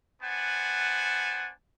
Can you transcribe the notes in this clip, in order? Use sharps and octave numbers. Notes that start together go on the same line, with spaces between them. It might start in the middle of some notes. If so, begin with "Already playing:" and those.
B3 D4 C5 F#5 G#5 A5